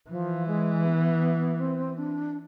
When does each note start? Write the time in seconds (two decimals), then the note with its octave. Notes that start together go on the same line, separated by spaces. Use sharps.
0.10 E3 F3
0.47 G#3
0.85 B3
1.60 C4
1.98 D4